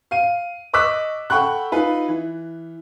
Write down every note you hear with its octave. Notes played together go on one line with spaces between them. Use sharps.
F5 D#7
D#5 C#6 D6 E6 F#6 B6
A4 F#5 G5 B5 C#6 F#6
D#4 F4 B4
E3